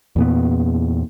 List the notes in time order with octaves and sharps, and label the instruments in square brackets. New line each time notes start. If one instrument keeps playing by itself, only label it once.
[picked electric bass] E2 A#2 B3